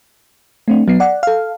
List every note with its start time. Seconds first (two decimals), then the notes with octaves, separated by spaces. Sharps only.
0.68 A3 C4 D4
0.88 F#3 B3 C7
1.00 D5 F#5
1.23 A4 F5